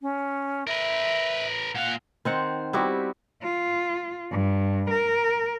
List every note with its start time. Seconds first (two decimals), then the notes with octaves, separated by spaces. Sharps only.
0.01 C#4
0.67 A#4 B4 E5
1.75 A#2 F5 F#5
2.25 D#3 C4 F#5 C6
2.73 G3 B3 C4 E4 F#4 G4
3.42 F4
4.31 G2
4.90 A#4